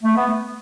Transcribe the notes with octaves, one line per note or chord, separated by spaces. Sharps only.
A3
B3